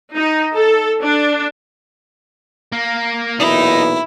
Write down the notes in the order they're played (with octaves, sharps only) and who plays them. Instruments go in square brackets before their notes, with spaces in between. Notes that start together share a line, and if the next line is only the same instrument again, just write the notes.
[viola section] D#4
A4
D4
[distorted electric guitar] A#3
[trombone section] B1 A#2 E3 [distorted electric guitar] D#4 [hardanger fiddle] E4